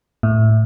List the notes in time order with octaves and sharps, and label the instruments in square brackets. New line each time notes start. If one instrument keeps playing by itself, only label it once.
[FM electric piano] A2